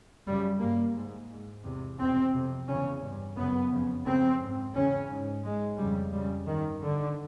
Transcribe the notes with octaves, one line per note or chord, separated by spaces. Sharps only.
F#2 C#3 G3
G2 A#3
G#2
G#2
E2 C3
E2 B2 C4
F2 C3
E2 C#3 C#4
G2
F#2 C#3 B3
F2 C#3
F2 C#3 C4
G#2
E2 C#3 C#4
G#2
G#2 G#3
F2 C#3 G3
F2 C#3 G3
G2 D#3
G2 D3